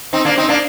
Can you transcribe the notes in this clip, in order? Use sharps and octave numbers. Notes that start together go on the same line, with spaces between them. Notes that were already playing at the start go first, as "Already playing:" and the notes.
C4 D#4
A#3 D4
C4 D#4
A#3 D4